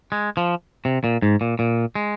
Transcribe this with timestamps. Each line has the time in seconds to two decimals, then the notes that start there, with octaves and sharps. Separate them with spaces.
0.12 G#3
0.37 F3
0.85 C3
1.04 A#2
1.22 G#2
1.41 A#2
1.59 A#2
1.95 G#3